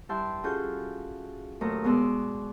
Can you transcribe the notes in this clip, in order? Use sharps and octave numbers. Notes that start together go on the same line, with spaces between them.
G2 E4 E5 G5 A5 C6
C#4 F4 F#4 G#4 A4 G6
D#2 A#2 F#3 A3 D#5 A#5
B2 G#3 B3 D5 C6 E6